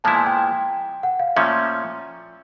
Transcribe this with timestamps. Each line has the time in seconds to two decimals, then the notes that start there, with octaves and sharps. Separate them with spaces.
0.04 A#2 F3 G#3 B3 E4 A5
0.15 G#5
0.27 G5
1.03 F#5
1.20 F5
1.36 A#2 F3 A3 C#4 E5